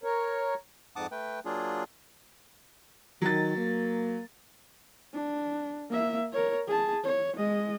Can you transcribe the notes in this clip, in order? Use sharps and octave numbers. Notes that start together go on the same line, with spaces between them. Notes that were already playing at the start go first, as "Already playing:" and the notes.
A#4 C#5
F2 G#2 F#5 A5 D6 D#6
A3 B4 G5
F#3 A#3 D4 F4 G#4
D#3 F#3 A6
A#3
D4
A#3 E5
A#4 C#5
G#4 A5
C#5
G#3 D#5